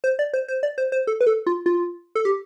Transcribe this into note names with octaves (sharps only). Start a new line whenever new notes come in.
C5
D5
C5
C5
D5
C5
C5
A4
B4
A4
F4
F4
A4
G4